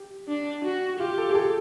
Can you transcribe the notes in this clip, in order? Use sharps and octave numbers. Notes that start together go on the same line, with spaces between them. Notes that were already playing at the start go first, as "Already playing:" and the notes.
Already playing: G4
D4
F#4
F4 G4
A4
G#4
A4